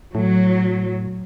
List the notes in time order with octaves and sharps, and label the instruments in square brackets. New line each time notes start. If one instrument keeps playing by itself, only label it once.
[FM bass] A2 [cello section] F#3